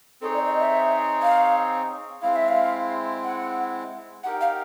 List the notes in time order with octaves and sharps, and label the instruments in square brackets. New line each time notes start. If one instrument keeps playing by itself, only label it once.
[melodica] C4 D#4 G#4 C#5 [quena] A4
[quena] D5
D#5
E5
F5
[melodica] G#3 C4 E4 [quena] F5
[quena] E5
F5
F#5
[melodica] D#4 G4 A#4 [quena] F#5
[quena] F5